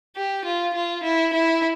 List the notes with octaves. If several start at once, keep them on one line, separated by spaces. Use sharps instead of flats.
G4
F4
F4
E4
E4